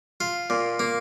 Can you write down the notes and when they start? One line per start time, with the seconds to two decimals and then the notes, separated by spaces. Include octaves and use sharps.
0.20 F4
0.50 A#2
0.80 A#3